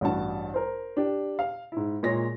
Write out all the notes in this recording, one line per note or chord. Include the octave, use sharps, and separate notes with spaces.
A1 G2 F#4 A5
A#4 C5
D4 G4
F5
G#2 E4
A#2 G#3 G#4 C#5 A#6